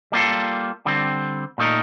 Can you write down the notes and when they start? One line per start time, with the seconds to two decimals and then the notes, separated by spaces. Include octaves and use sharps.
0.12 G3 A#3 F4 A4
0.86 D3 G3 C4
1.58 A#2 A3 D#4 A#4